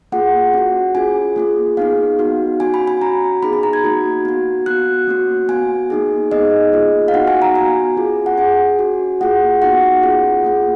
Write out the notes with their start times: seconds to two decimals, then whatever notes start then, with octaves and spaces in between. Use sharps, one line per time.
0.12 A#3 F4 G#4 F#5
0.54 C#4 F#4
0.95 C#4 F4 G#4 G#5
1.36 A#3 F4 G#4
1.77 B3 D#4 G#4 F5
2.19 B3 D#4 F#4
2.60 C#4 F#4 G#5
2.74 B5
2.88 G#5
3.01 C#4 F#4 A#5
3.42 B3 D#4 G#4 B5
3.53 B5
3.63 A#5
3.73 G#6
3.84 A#3 D#4 F#4
4.25 B3 F#4
4.66 B3 F#4 F#6
5.07 A#3 C#4 F#4
5.49 B3 F#4 G#5
5.90 A#3 D#4 G#4
6.31 B3 D#4 G#4 D#5
6.73 A#3 F4 G#4
7.08 F5
7.14 B3 D#4 F#4 F#5
7.27 G#5
7.42 A#5
7.55 B3 F#4 G#5
7.97 C#4 F4 G#4
8.26 F#5
8.38 C#4 G#4 G#5
8.79 C#4 F#4
9.21 A#3 F4 G#4 F#5
9.62 B3 D#4 F#4 F#5
10.03 C#4 F4 G#4
10.44 A#3 F4 G#4